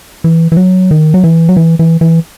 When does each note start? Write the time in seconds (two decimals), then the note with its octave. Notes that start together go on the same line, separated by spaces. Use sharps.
0.24 E3
0.52 E3
0.57 F#3
0.91 D#3
1.14 F#3
1.24 E3
1.49 F#3
1.57 E3
1.79 E3
2.01 E3